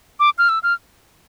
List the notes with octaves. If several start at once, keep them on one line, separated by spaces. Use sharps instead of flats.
D6
F6
E6
F6